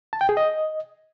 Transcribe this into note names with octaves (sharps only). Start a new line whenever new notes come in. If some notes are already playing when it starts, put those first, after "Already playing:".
A5
G5
G#4
D#5